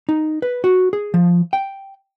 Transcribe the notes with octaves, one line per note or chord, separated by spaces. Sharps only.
D#4
B4
F#4
G#4
F3
G5